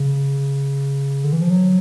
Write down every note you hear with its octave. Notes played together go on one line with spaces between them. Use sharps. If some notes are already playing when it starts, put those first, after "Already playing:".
Already playing: C#3
D3
E3
F3
F#3